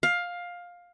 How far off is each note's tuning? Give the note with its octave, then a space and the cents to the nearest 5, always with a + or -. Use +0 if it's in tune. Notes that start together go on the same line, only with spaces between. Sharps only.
F5 +15